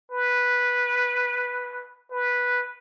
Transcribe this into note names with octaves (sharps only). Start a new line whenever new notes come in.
B4
B4